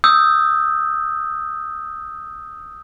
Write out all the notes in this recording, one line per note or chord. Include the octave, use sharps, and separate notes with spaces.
D#6 E6 G6